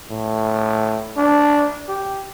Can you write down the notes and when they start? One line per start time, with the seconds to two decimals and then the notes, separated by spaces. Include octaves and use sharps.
0.10 A2
1.17 D4
1.89 G4